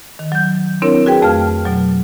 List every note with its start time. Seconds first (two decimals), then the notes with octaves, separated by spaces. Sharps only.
0.19 D#3
0.32 F#3 G6
0.82 C4 D4 E4 A#4 C#5
1.06 F#4 G#4 B4 G5
1.22 F2 A3 F5 A5 F6
1.65 B2 F#3